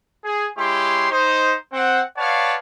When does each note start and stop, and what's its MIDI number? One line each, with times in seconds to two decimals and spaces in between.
0.25 0.47 68
0.58 1.10 56
0.58 1.10 64
0.58 1.10 67
0.58 1.10 73
0.58 1.10 84
1.11 1.55 63
1.11 1.55 72
1.73 2.01 60
1.73 2.01 78
2.17 2.56 71
2.17 2.56 73
2.17 2.56 74
2.17 2.56 77
2.17 2.56 78
2.17 2.56 81